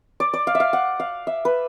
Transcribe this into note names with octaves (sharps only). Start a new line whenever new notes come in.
D5
D5
F5
E5
F5
F#5
F5
E5
B4